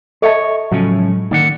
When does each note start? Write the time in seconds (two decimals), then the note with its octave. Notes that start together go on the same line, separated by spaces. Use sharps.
0.22 A4 C#5 D#5 E5 A5
0.72 A2 C#3 F3 F#3 G#3 C#4
1.31 D3 D#3 A#3 D5 F#5